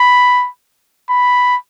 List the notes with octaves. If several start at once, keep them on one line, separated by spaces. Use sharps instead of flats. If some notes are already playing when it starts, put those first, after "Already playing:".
Already playing: B5
B5